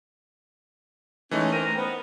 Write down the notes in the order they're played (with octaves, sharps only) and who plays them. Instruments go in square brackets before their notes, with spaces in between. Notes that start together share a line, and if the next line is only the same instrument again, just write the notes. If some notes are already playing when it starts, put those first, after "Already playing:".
[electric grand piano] E3 A3 D#4 [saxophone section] G#3 C#4
[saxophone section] C4 A#4 [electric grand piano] D#7
[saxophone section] B3